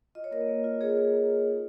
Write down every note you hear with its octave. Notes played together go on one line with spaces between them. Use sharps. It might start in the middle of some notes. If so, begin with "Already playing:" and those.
F4 D#5
C#5
A#3 A#4 D#5
A#3
F4
F4 G#4 C#5
A#3
A#3
F4
D#4